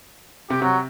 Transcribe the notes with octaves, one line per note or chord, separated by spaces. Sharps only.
C3 G4
C3 F#3